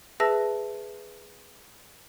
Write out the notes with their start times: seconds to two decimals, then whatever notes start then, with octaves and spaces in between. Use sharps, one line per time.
0.20 G#4 B4 E5 A5 E6 A#6